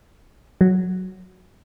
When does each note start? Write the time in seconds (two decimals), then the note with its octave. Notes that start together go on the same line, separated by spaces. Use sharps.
0.61 F#3